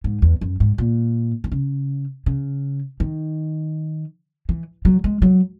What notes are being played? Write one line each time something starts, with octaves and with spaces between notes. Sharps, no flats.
G#2
E2
F#2
G#2
A#2
D#3
C#3
C#3
D#3
E3
F#3
G#3
F#3